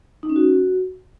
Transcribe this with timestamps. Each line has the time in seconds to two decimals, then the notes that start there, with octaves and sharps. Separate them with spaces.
0.23 D#4
0.29 C#4
0.36 F#4